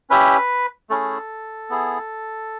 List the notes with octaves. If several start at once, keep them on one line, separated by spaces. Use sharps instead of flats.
C#4 E4 G4 B4
A3 C#4 E4 G#4 A4
B3 E4 G#4